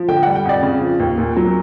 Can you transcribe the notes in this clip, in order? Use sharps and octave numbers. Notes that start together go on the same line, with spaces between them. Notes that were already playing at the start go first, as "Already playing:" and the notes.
Already playing: F3
D3 G5
G3 F#5
G5
F2 D5
C#3
F3
D#2
A#2
F#3